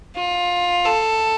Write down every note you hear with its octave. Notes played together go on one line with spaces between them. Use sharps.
F4
A4